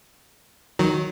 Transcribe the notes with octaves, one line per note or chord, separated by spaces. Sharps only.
D#3 F#3